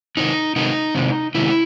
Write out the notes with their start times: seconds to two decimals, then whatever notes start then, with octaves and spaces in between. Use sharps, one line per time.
0.17 C3 D#3 G#3 C4 D#4
0.56 C3 D#3 G#3 C4 D#4
0.95 C3 D#3 G#3 C4
1.35 C3 D#3 G#3 C4 E4